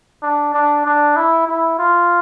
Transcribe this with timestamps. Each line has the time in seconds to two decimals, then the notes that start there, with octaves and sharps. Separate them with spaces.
0.22 D4
0.54 D4
0.85 D4
1.16 E4
1.48 E4
1.79 F4